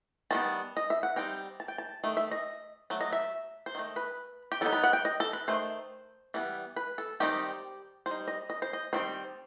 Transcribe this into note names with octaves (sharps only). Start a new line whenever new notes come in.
D#3 G3 B3 A5
D#5
E5
F#5
G3 C4 D#4 G5
A5
G5
A5
D#3 A3
E5
D#5
F#3 A3
D#5
E5
C5
D#3 A3 D#4
B4
G4
F#3 B3 D#4 A4
B4
F#5
G5
D#5
A4
B4
D#3 A3 C5
E3 G3 B3
B4
A4
D#3 G3 C4 D#4 G4
G3 D#4 C5
D#5
D#5
C5
D#5
D#3 G3 C4 C5